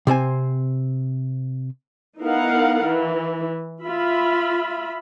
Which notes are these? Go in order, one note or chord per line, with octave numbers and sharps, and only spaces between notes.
C3 C4 C5 G#5
B3 D#4 E4 A#4 F5 F#5
E3
F4 E5 B5